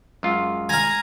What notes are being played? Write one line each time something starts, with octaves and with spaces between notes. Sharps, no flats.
F#2 G#3 F4
F5 G#5 A#5